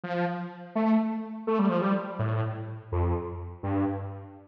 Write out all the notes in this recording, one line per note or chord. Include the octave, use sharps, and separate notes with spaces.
F3
A3
A3
G3
F3
G3
A2
F2
G2